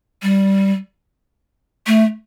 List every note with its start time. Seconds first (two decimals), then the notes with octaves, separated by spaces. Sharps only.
0.22 G3
1.87 A3